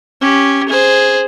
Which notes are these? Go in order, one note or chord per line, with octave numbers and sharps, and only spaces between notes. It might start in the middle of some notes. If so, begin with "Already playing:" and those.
C#4 G4
G#4 C5